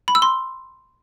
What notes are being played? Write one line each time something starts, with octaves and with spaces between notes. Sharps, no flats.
B5
E6
C6